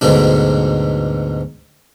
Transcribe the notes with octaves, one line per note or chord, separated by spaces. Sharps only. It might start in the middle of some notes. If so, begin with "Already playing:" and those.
D2 G#2 B2 F#3 D4